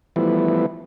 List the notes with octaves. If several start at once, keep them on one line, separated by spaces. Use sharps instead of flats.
E3 F3 G3 A3 B3 E4